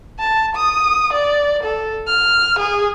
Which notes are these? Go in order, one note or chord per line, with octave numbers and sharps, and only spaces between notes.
A5
D#6
D5
A4
F6
G#4